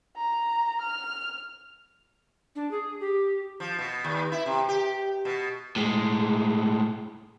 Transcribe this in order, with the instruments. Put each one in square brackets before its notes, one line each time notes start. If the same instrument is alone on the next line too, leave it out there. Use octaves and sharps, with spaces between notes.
[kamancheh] A#5
F6
[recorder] D4
G#4
G4
[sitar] F3
B2
D#2
E4
C3
G4
B2
[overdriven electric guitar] A2 G#3